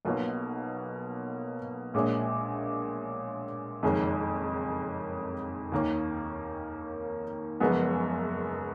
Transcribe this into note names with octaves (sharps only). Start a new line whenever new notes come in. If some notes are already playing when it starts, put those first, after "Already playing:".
B1 B2 A#3 C#4 F4
A#1 A#2 G#3 C#4
F#1 F2 D#3 G#3 C#4
D#2 D#3 A#3 C#4
F#1 F#2 F3 G#3 B3